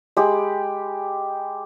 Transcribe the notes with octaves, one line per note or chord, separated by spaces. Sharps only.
G#3 G4 B5